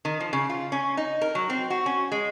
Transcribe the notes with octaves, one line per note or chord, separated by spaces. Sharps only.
D#3
F3
C#3
F4
C#4
D#4
A#4
F#3
C4
F#4
C#4
G#3